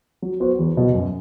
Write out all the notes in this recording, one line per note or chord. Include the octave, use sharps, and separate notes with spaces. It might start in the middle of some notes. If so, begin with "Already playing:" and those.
F#3
B3 F#4 C5
E2
B2 F#3 B3
F#2